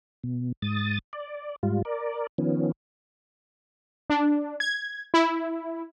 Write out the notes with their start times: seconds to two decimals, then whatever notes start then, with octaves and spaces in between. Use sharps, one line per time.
0.24 B2
0.62 G#2 D#6 A6
1.13 D5
1.63 G#2 G3 F4
1.85 A#4 D5
2.38 D#3 F3 B3 C#4
4.10 D4
4.60 G#6
5.14 E4